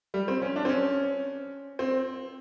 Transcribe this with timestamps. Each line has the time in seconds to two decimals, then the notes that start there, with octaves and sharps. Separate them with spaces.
0.14 G3
0.28 C4
0.42 C#4
0.56 D4
0.65 C4
0.69 C#4
1.79 C4